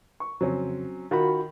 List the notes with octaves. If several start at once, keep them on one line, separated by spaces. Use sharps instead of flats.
C#6
F2 C#3 F#3 C4 C#4
D#3 F4 F#4 B5